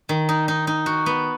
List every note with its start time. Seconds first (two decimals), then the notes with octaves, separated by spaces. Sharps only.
0.09 D#3
0.29 D#4
0.48 D#4
0.67 D#4
0.86 F#4
1.06 B3